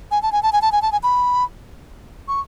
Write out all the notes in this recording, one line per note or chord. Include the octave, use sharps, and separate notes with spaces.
G#5
A5
G#5
A5
G#5
A5
G#5
A5
G#5
B5
C#6